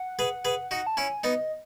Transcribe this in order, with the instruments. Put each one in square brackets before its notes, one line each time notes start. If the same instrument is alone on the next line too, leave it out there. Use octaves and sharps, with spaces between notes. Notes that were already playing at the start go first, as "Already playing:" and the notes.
Already playing: [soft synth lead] F#5
[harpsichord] G#4 B4
G#4 B4
[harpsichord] D#4 F#4 [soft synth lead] F#5
[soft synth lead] A5
[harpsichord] C#4 E4 [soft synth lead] G#5
[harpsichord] B3 D#4 [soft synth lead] D#5